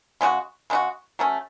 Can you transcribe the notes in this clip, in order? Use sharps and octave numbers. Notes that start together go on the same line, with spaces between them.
C#3 G#3 D#4 F#4
C#3 G#3 D#4 F#4
F#3 A3 C#4